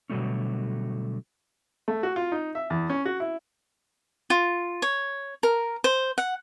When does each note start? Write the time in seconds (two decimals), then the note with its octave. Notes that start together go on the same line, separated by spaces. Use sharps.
0.10 B2 D3 F#3 G3 A3 C#4
1.88 A3
2.03 F#4
2.16 F4
2.32 D#4
2.55 E5
2.70 E2
2.90 C#4
3.05 F#4
3.20 E4
4.30 F4
4.82 C#5
5.43 A#4
5.84 C5
6.18 F#5